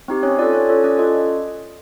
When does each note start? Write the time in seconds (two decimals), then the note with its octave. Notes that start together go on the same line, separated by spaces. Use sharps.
0.08 C4 D#4 G4
0.23 C#4 C#5
0.39 F4 A4 D5
0.53 C#4 C#5
0.69 F4 A4 C#5
0.84 C#4 D5
0.99 F4 A4 D#5